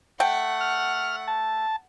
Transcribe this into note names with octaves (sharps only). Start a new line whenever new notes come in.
A3 F#5 G5
F6
A5